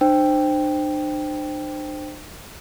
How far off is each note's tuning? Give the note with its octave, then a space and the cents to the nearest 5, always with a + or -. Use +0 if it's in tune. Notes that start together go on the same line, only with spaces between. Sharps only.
D4 +45 C5 +0 G5 +5